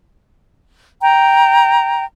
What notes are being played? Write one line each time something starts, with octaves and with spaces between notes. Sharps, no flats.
G5 A#5